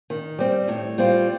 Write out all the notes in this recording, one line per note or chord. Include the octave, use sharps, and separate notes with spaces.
D#3
G3 C4
A2
G3 C4 F4 C5